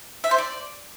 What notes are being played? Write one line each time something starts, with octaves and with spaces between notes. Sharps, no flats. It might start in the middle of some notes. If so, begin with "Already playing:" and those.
E5
C5
D5